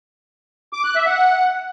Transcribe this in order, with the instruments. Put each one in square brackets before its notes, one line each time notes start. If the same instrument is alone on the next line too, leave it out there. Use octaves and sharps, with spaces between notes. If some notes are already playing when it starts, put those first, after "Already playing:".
[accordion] D6
F#6
E5
F#5